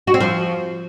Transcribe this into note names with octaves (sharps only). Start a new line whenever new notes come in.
F#4
C4
F3